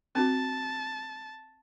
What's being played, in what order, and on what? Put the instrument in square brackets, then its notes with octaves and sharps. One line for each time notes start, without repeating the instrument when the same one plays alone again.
[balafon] C4 D4 F#4 [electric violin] A5